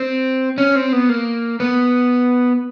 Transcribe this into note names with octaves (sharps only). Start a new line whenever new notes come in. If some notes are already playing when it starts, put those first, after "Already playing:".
Already playing: C4
C#4
C4
B3
A#3
B3